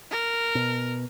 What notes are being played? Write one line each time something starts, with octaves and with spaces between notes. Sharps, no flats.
A#4
B2